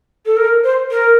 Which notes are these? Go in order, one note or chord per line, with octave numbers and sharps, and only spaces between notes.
A4
A#4
C5
A#4